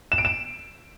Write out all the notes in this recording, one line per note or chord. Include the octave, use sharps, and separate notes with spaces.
E7
D7
E7